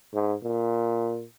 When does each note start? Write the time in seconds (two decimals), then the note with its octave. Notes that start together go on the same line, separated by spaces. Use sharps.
0.14 G#2
0.43 A#2